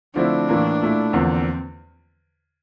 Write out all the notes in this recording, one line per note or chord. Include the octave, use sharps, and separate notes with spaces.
D3 F3 A3 C4 D4 E4
A2 E3 A#3 F4
A#2 A3 E4
E2 D3 F3 A#3 C4